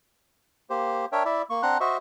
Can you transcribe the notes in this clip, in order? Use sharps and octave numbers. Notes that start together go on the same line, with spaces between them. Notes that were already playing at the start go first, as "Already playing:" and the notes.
A#3 G4 C5
D4 A#4 C#5 E5 G5
E4 D5 E5
A#3 C#6
C4 D4 F#5 A#5 C6 F#6
F#4 C5 D#5 E5 C#6